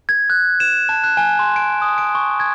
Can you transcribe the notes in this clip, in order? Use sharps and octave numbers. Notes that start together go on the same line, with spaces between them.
G#6
F#6
E7
A5
F#6
G#5
C6
D7
D#6
D7
C#6
G#6